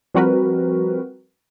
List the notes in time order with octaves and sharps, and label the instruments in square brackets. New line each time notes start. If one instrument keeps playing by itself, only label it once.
[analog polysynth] F3 G3 C4 F#4 A#4 B4